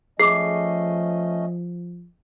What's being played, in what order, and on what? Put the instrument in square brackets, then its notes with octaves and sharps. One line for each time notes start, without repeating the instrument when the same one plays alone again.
[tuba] F3 [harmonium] A3 C#4 D#5 [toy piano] G#4 D6 [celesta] C7